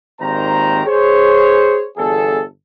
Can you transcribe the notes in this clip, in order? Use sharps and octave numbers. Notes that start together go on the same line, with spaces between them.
G#1 A#2 D#3 G4 C5 A#5
G#4 C5 C#5
G1 E2 G#4 A4